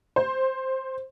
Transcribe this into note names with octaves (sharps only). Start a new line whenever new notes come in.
C5